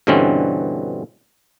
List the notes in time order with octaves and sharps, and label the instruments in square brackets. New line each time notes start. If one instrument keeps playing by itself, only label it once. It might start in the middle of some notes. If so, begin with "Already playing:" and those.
[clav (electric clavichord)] G2 B2 D3 E3 C4 C#4